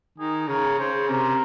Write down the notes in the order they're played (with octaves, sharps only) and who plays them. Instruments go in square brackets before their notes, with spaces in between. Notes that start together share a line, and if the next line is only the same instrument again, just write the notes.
[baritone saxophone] D#3 [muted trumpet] G#4
[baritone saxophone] C#3 [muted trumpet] A#4
[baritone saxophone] C#3 [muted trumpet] C5
[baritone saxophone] C3 [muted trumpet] A#4